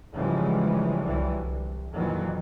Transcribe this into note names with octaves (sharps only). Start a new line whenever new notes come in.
G#2 C#3 E3 F3 G3 G#3
C2 D3 E3 F#3 G3
C2
F2 A#2 D#3 E3 F#3